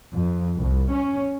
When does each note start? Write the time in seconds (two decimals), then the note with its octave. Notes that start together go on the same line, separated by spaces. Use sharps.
0.13 F2
0.58 C2
0.91 C#4